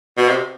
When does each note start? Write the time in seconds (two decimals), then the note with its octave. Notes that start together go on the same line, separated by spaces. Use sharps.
0.18 B2
0.29 C3